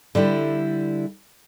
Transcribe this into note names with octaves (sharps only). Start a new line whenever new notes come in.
D3 G3 E4